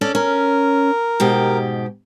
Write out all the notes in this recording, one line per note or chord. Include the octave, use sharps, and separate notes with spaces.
C#4 A4 D5
C#4 A#4
G#2 B2 G4